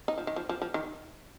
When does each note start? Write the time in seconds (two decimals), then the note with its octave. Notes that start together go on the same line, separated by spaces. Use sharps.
0.08 D#4
0.18 F3
0.27 D#3
0.36 F3
0.49 F3
0.62 F3
0.74 D#3